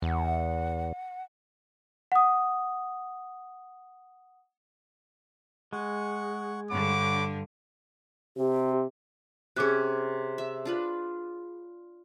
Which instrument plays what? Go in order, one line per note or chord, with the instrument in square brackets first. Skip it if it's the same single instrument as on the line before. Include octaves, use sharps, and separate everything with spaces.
[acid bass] E2 [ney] F#5
[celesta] F#5 D#6
[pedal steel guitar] G#3 [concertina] F#5 C#6
[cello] G2 D3 [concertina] C#5 F#5 B5 [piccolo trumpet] D6
[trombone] C3 [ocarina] G4
[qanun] C3 C#4 [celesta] G#4 D6 F#6
[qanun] E5
D4 F4 B4